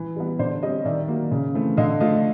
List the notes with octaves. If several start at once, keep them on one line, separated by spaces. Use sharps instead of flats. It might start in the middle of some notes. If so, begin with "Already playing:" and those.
Already playing: E3
G3 B3
D3 C5 D5
G3 C4 C#5 D#5
D#3 D5 E5
F#3 A#3
C#3
E3 A3 C4
D3 D#5 F5
F3 A3 D#5 F5